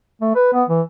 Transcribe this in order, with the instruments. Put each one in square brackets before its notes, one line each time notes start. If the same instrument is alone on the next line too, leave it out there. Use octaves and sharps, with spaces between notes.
[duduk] A3
B4
B3
E3